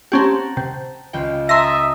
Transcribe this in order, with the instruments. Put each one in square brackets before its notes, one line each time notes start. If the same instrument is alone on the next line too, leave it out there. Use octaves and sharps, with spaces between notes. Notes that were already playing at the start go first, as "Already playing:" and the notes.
[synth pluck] C4 C#4 G4 [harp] F#5 A5 A#5
[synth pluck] C3
[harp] C#2 F4 G5
[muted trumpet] E5 [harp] A5 A#5 D#6 [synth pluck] C6 A#6